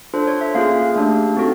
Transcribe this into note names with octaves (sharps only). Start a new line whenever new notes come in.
D4 F4 A4 C5
C#5
E5
A#3 C#4 F4 G#4 F5
A3 D4 G4
C4 D#4 F#4 A4